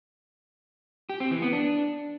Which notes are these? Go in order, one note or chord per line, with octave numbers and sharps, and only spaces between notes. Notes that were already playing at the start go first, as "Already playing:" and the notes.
G4
C4
E3
B3
D4